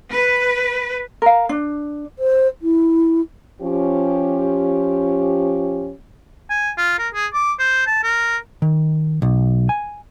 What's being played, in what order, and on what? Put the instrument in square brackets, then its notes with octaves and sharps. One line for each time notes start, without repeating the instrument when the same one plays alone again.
[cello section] B4
[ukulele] A#4 F5
D4
[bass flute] C5
E4
[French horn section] F3 C#4 G4
[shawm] G#5
F4
A#4
G#4
D6
C5
A5
A#4
[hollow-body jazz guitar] D#3
B1
G#5